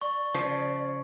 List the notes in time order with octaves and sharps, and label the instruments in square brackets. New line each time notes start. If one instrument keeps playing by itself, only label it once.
[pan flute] D5 [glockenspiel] C#6
[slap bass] C#3 [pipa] F3